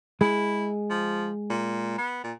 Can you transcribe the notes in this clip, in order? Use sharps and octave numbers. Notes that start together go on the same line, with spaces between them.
G#3 E4 G#4
F3
A#2
B3
A#2